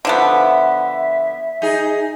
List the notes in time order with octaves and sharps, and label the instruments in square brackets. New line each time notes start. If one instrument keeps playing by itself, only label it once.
[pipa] D3 F3 B3 [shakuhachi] E5
[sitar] D#4 G#4